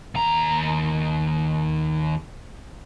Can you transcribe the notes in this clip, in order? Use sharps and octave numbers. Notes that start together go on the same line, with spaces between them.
D#2 A#5